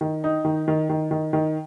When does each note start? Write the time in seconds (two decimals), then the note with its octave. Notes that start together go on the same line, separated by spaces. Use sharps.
0.01 D#3
0.24 D#4
0.45 D#3
0.68 D#3
0.89 D#3
1.11 D#3
1.33 D#3